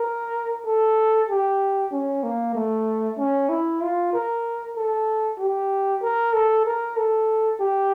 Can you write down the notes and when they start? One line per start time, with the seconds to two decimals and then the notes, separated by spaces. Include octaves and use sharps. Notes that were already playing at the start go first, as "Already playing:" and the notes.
Already playing: A#4
0.66 A4
1.29 G4
1.92 C#4
2.24 A#3
2.55 A3
3.18 C#4
3.49 E4
3.81 F4
4.13 A#4
4.76 A4
5.39 G4
6.02 A#4
6.34 A4
6.66 A#4
6.97 A4
7.60 G4